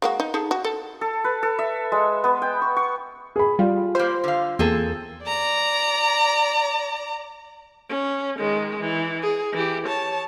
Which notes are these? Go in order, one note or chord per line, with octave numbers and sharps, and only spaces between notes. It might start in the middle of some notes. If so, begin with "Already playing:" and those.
G#3 A#3 F#4
D#4
D#4 G#4 A4
F#4
A4
A4
B4
A4
E5
G#3
B3
G5
C#6
C#6
G#4 B5
G3 F4
G3 A#3 C5
D3 F5
E2 A#3 C4 G#4 A4
D5 A#5
C#4
D#3 G#3
E3
G#4
E3 G4
C#5 A5